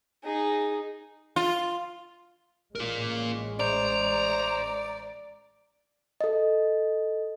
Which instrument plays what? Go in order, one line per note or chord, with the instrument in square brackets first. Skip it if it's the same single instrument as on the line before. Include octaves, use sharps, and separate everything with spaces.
[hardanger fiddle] D#4 G#4
[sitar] F4
[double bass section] A1 G#3 C#4 [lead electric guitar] F4 A#4
[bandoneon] C5 [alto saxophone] D5 [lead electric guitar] A#5
[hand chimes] A4 D#5